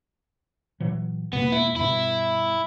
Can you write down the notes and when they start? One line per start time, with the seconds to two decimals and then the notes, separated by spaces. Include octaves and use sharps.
0.80 A#2 E3 F#3
1.33 E1 B2 A#3 B3
1.52 E4
1.76 G2 B2 E4